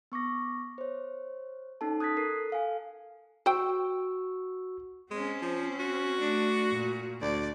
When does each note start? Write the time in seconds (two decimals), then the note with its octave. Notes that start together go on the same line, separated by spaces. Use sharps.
0.12 B3 C#6 D6 A#6
0.78 C5 C#5
1.81 C#4 D#4 A4 A5
2.00 D#6 F#6 G#6 A6 B6
2.17 A4 A#4 C7
2.50 A4 F5 G#5
3.46 F#4 C5 G5 C#6 E6
5.11 G#3 C4 C#4
5.42 F3
5.80 F#4
6.19 A3 D4
6.72 A#2
7.22 D2 D5